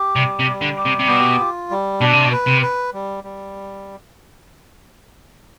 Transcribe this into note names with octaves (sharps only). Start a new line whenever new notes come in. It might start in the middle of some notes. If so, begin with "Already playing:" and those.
Already playing: G4
C3 G3
C3
G3
D3
G4
C3
C3
B2 B3
F4
G3
B2 D4
C3
B2
B4
C3
B4
G3
G3